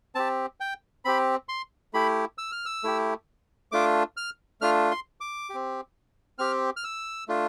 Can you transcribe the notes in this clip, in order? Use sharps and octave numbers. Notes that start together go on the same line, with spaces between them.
C4 G4 A5
G5
C4 G4 B5
C6
A3 E4 G4 B5
E6
F6
E6
A3 E4 G4
A3 D4 F4 D6
F6
A3 D4 F4 F6
C6
D6
C4 G4
C4 G4 F6
F6
E6
A3 D4 F4